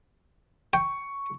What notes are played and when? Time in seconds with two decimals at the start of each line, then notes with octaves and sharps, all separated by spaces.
0.73 G5 C#6